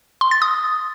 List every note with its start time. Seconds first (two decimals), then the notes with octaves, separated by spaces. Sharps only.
0.21 C6
0.31 A6
0.42 D#6